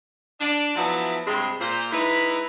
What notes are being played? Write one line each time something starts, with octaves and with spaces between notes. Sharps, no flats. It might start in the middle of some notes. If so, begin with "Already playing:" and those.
D4 D5
F3 F#3 B3 E4 E5 A5
G2 C3 G#3 C4 B5 C6
A#2 C5
G#3 D#4 E4 B4